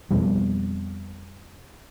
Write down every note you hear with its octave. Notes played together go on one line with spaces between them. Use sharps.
F2 B2 G3